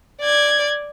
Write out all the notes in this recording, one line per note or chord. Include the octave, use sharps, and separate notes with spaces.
D5 G#6